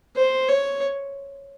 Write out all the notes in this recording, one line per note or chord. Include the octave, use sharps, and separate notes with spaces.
C5
C#5